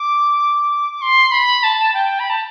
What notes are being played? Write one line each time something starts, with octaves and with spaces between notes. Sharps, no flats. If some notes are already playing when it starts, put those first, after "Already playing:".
Already playing: D6
C6
B5
A5
G5
B5
A5